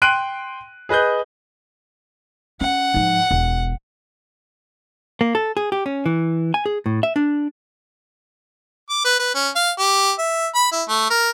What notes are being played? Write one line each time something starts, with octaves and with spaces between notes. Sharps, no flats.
G5 C6 F#6 D7 D#7
G#4 B4 D#5 F#6 G6
C#4 F#5
G#2 F3
E1
A#3
A4
G#4
G4
C#4
E3
G#5
G#4
A2
E5
D4
D6
B4
B4
C#4
F5
G4
E5
B5
E4
A3
A#4